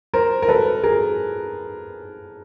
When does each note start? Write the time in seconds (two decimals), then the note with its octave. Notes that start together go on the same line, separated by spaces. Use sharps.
0.14 A#4 C5
0.42 A#4
0.48 A4 B4
0.83 G#4 A#4